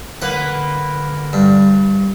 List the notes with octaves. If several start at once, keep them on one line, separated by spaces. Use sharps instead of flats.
D3 A#3 B4 F#5
G2